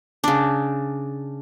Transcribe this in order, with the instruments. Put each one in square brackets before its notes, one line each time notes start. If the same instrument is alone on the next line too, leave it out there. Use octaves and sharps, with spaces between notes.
[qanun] C#3 D4